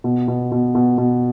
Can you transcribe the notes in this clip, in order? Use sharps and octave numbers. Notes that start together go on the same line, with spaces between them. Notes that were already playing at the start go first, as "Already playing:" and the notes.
B2
B2
B2
B2
B2